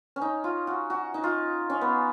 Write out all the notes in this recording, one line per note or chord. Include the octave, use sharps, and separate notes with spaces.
C#4
D#4
F4
F#4
F#4
D#4
F4
C#4
B3